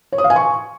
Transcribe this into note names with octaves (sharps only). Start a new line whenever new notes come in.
C#5
D#6
F5
G#5
C#6